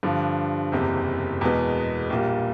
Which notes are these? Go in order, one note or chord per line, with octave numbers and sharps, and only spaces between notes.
G2 D3 F3
F#1 E2 C3
E2 B2 G#3 B3
A#1 A#2 G3